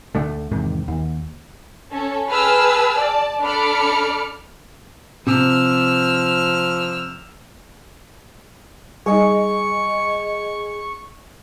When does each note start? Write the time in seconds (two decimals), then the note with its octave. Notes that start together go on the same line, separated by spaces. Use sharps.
0.15 D2 D3 A3
0.51 E2 G#2 C3 D#3
0.88 D#2
1.93 C#4 A4
2.30 G#4 B4 G5 A5 E6 F6
2.99 D5 A5
3.42 D4 A4 B5 D6 F6 C#7
5.27 C3 F3 E6 F6
9.06 G3 D#4 G#4 D#5 C#6